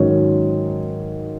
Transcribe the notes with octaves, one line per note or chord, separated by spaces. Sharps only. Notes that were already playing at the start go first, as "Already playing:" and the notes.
Already playing: G#2 D#3 F#3 C#4